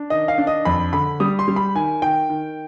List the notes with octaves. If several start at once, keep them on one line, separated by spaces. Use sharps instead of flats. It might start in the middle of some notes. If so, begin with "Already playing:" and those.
Already playing: D4
D#3 D#5
F5
D4
D#5
F2 B5
D3 B5
G3 D#6
C6
G3
B5
D#3 G#5
D#3 G5
D#3